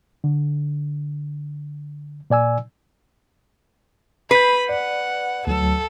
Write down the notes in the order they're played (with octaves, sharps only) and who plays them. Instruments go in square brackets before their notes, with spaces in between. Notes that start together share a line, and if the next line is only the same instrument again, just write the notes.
[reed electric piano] D3
A#2 D5 G#5 E6
[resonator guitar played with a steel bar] B4 [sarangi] B5 [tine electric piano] G6 C7
[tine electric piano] D5 [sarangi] F#5
[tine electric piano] D2 F#3 [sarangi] A4